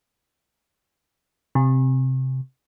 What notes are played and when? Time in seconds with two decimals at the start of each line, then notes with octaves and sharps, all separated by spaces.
1.55 C3